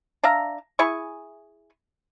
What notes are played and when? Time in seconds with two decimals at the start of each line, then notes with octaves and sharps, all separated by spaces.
0.23 D4 E5 F5 A#5
0.79 E4 G#4 G#5 C#6